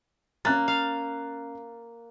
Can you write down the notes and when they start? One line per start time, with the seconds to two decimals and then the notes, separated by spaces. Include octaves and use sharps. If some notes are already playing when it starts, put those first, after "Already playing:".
0.45 A#3 C#4 F#6 A6
0.68 F5